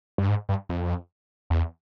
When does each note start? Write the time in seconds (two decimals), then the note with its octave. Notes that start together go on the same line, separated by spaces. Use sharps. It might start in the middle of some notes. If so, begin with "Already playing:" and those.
0.18 G2
0.29 G#2
0.49 G2
0.69 F2
1.50 E2